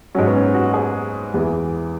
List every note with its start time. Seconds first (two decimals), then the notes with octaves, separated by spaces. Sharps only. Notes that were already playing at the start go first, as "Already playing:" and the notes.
0.15 G#2 F#3 C#4
0.27 B3
0.34 C#4
0.54 F#4
0.74 G#4
1.34 E2 E3